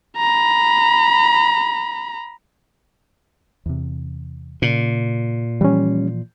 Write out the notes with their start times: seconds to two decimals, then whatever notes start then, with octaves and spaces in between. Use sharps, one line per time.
0.17 A#5 B5
3.66 E2 C3
4.62 A#2 C#3
5.61 E3 F3 G3 C#4